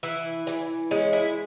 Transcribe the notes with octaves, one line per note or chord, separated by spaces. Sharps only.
E3 E4
E3
G#3 C#4
E4